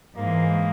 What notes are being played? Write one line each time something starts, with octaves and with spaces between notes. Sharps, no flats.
G#2 E3 G#3 A#3